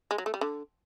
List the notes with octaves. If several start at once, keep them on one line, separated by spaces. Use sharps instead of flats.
G#3
F#3
A3
G3
D3